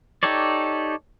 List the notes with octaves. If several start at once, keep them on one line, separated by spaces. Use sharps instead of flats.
D#4 G4 A4 C#5 D5